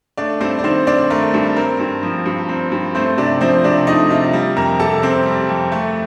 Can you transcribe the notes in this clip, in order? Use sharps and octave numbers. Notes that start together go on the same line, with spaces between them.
A3 D4 D5
G2 C4 C5
D5
D#3 C4 C5
C4 D4 D5
A3 A#4
G2
C4 A#4
G2
F3
G2
C4
G2
A3 C4 C5
C3 D4 D5
F3 C4 C5
C3 D4 D5
A3 D#4 D#5
C3 F4 F5
G3
F2 A#4 A#5
C3 A4 A5
C4
G3
F2
A3